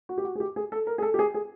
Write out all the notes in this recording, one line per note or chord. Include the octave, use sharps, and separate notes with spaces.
F#4
G4
F#4
G#4
G4
G#4
A4
A#4
G#4
A4
G4
G#4
G#4